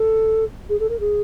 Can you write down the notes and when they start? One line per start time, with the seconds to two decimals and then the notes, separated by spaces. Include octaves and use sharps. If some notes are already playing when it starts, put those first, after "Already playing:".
Already playing: A4
0.69 G#4
0.79 A4
0.89 A#4
1.00 G#4